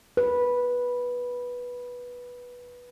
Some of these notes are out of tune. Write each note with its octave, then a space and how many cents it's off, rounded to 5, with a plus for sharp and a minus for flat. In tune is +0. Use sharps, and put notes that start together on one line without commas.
B4 -10